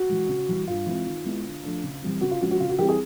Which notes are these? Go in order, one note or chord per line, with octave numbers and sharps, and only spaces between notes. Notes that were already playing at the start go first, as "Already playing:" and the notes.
Already playing: F#4
E3 G#3
C#3
E3 G3
G2 F4
E3 G#3 C4 E4
D#3
G#3 B3 E4
D3
F3 A3 D4
C#3
E3 G3 C4
C#3 F#4
F4
F3 G#3 C#4 F#4
F#4
C#3 F4
F#4
E3 G3 C4 E4 G4
G#4